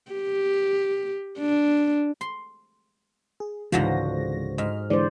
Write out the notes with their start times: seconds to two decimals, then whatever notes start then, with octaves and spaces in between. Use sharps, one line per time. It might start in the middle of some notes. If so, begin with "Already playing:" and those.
0.12 G4
1.39 D4
2.21 C6
3.40 G#4
3.72 C#2 G#2 D3 E3 F3 F#4 A#6
4.58 G#2 D#5 F6
4.90 D3 E3 G#3 C5 D5